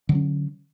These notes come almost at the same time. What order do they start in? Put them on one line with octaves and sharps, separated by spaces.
D3 F#3 C#4